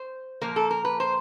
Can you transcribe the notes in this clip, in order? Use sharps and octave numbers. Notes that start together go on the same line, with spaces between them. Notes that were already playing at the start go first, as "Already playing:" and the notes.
Already playing: C5
A#2 F3 A#3 A#4
A4
A#4
B4
C5